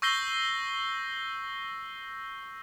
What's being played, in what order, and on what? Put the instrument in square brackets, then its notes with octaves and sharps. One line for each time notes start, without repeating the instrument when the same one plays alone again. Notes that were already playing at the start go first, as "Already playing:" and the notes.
[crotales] C#6 E6 G6 A#6 C7 G7